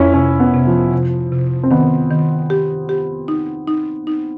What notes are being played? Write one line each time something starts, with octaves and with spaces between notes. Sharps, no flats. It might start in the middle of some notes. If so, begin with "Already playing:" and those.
Already playing: F2 C#4 E4
C3 C#4
B3
C3
F3
C3
C3
C4
D#3 B3
D#3
G4
G4
D#4
D#4
D#4